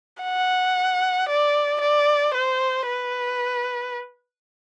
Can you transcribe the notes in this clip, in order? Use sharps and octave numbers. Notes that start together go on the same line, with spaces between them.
F#5
D5
D5
C5
B4